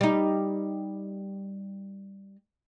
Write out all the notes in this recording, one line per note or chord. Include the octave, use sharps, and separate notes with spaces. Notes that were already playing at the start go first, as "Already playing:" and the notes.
G3 D#4